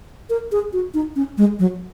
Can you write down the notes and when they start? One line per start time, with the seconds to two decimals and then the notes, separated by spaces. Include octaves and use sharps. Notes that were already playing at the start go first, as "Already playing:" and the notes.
0.30 A#4
0.52 G#4
0.73 F#4
0.94 D#4
1.16 C#4
1.38 G#3
1.59 F#3